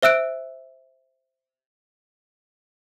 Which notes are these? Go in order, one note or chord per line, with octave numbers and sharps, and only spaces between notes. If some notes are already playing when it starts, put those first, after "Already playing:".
C5 E5 E6 F#6 D7